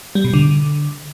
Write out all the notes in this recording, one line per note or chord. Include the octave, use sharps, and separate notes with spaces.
G3
B2
D3